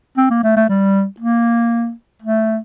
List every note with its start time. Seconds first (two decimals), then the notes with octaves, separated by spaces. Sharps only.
0.18 C4
0.30 A#3
0.43 A3
0.57 A3
0.69 G3
1.20 A#3
2.22 A3